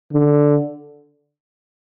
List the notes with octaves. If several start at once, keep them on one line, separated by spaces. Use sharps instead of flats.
D3